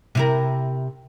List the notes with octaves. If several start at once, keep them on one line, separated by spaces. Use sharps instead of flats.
C3 E4 A#4